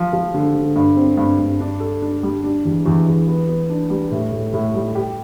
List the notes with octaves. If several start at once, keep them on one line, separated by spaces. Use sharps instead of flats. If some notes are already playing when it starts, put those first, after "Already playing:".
Already playing: F3
F3
D3
D3
G2
C4
G2
G2
D4
A4
D4
G3
D4
E2
E2
E2
B3
B3
D4
G3
A2
A2
A2
G3
G4